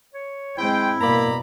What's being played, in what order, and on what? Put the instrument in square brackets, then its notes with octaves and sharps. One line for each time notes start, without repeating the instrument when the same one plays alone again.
[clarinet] C#5
[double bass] G#3 C4 [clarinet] E4 [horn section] C5 G5
[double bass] G2 B2 [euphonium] A#3 [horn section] D5 A#5 B5